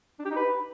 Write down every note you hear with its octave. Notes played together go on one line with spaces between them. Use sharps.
D4
G4
D#4
B4